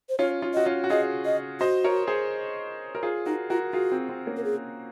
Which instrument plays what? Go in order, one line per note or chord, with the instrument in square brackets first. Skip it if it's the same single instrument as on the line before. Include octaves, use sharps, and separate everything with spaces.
[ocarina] C5
[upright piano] C#4 F4 [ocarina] C#5
[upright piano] C#4 F4
[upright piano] F#4 [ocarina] D#5
[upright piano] C#4 F4
F#4
[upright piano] F4 G#4 [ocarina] D#5
[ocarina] D#5
[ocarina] F#4 [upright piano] C5 D#5
[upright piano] A#4 C#5
G#4 C5
A#4
F4 G#4
[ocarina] D#4 [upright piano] F#4 A#4
[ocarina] F4 [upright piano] F#4 A#4
[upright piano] F4 G#4 [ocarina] F#4
[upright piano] C4
C4
A#3 C#4
[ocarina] A#4
G#4